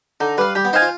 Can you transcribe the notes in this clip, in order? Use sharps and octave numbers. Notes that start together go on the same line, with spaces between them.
D3 D#4
G3 B4 F5
G3 G4
B3
D#4 C5 F5 G#5
F4